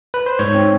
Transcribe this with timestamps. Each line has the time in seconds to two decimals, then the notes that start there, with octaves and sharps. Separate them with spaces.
0.14 B4
0.26 C5
0.39 G#2 C#5
0.55 C4